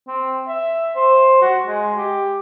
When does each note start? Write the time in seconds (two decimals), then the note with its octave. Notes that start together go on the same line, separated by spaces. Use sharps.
0.08 C4
0.48 E5
0.96 C5
1.41 F#4
1.65 G#3
1.97 G4